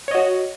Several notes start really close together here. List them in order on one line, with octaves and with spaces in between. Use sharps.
C#5 D#5 F#4